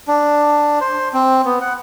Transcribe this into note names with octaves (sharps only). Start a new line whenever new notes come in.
D4
C5
C4
B3
F#5